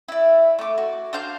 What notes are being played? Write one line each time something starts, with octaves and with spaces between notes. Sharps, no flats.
E4 D5
A3 D6
F#4
D4 C5 F5 G6